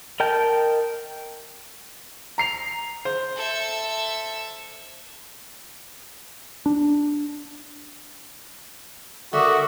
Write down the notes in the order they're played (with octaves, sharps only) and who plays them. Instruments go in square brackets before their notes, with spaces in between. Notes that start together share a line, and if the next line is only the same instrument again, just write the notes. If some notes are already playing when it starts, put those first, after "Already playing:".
[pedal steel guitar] A#4 D#5 G5 A5 G6
[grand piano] A#5 C7 F7
C5
[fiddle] A4 E5
[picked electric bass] D4
[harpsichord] D3 [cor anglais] F#4 [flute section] A#4 D6 D#6 [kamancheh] E5 F#5